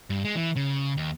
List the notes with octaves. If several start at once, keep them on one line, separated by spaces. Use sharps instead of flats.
G2
G#3
E3
C#3
D#2